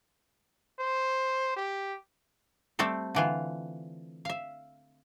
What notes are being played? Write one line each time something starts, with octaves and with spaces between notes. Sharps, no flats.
C5
G4
G3 A3 C4 A4
D3 E3 F4
E5 F5